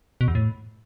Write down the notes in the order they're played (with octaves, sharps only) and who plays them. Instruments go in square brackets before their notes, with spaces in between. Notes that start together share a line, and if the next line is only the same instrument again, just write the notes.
[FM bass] B2
E2
A2